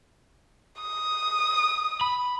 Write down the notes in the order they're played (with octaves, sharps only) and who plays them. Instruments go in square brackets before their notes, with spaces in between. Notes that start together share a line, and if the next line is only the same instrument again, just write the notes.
[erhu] D#6
[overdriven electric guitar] B5